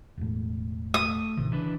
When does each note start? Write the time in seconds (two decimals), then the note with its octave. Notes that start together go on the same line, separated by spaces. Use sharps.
0.18 E1 A2
0.94 A3 D#6
1.37 A1 C3 D#3
1.52 C#3 E3 D4 B4